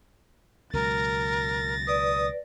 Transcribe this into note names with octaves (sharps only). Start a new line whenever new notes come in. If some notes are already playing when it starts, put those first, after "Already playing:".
C#2 B2 F#3 A#4 A6 A#6
B4 D5 D#6